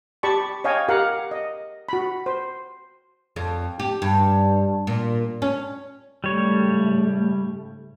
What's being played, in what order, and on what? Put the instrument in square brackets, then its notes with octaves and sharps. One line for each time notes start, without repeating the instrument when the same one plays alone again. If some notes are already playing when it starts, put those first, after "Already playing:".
[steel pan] G4 D5 A5 B5 C#6
C#5 D#5 F5 G5 G#5
G4 A#4 F5 F#5
D#5
F#4 B5
C5
[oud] F2
G4
G2
A#2
C#4
[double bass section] G#2 C#3 A3 [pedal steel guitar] G3 C#5